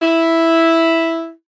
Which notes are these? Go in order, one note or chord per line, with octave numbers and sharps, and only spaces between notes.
E4